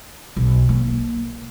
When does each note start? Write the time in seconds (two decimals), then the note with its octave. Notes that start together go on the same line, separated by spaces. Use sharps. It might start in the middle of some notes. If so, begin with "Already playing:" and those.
0.36 B1
0.69 A#3